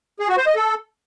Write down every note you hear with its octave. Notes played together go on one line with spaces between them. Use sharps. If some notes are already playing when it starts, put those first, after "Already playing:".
G#4
F#4
C5
D#5
A4